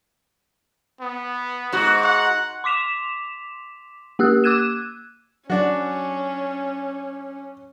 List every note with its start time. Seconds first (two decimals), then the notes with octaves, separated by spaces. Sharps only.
1.01 B3
1.72 G#2 F#4
2.04 F#5
2.64 C6 D6 B6 E7 F7
4.19 A#3 G4 E6 F#6
4.44 D6 E6 F#6 G#6 D#7 E7
5.50 F#3 C#4 D4 F#4